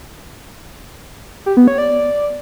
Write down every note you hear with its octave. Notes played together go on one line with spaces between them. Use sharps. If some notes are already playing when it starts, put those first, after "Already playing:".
G4
B3
C#5
D5